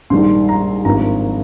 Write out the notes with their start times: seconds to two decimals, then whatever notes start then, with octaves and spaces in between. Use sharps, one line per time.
0.10 A#1 G#2 D#3 G3 A#3 C6
0.49 A#5
0.85 G#1 G2 F3 A#3 A#5